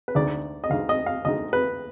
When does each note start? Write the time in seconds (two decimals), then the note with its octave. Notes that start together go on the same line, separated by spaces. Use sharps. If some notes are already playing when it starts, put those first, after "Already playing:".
0.08 B4
0.15 D2 D3 G#3 D#4 D5
0.64 D#5
0.70 D2 D3 G#3 D#4 F5
0.89 D#5
1.06 F5
1.25 D2 D3 G#3 D#4 D#5
1.53 B4